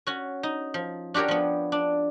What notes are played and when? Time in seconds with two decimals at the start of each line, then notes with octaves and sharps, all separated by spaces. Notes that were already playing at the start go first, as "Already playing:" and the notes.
0.07 C#4 F#4
0.43 D#4
0.74 F3
1.14 D4 F#4 G4 A#4 C#5
1.28 F3 B3
1.72 D4